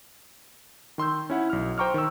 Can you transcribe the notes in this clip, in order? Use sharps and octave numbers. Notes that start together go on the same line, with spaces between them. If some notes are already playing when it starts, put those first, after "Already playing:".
D#3 C6 E6 G6
C#4 E4 F#5
B1 F6
C5 G5 A#5 C#6 D6 F6
D#3 C6 E6